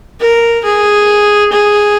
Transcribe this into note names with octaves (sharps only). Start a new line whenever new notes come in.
A#4
G#4
G#4